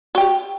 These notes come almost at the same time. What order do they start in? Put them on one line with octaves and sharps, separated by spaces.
F#4 G5 G4